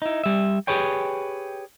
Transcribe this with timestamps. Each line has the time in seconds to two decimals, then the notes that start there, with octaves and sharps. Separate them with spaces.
0.02 D#4 E4
0.24 G3 E5
0.67 G4 G#4 B4 C#5 G5